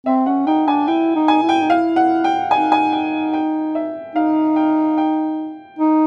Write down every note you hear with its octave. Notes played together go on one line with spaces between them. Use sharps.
C4 E5
C#4 F#5
D#4 G5
D4 G#5
E4 G5
D#4
G#5
E4
G5
D#4
E4 F5
F#5
G5
D#4 G#5
G#5
G5
G5
E5
D#4 F5
G5
G5
D#4